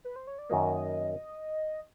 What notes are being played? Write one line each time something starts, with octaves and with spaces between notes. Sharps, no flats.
B4
C5
C#5
D5
F#2 D#3 F#3 A#3 D#5